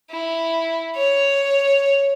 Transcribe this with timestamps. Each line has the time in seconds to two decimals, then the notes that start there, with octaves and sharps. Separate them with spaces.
0.11 E4
0.96 C#5